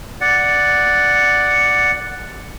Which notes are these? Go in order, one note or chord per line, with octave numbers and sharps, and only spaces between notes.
D5 F#5